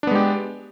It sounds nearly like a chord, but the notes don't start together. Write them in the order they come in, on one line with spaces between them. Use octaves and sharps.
D4 B3 G#3 G4